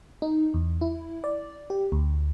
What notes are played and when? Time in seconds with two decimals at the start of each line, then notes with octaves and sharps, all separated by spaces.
0.22 D#4
0.54 E2
0.81 E4
1.24 D5
1.70 G4
1.92 D2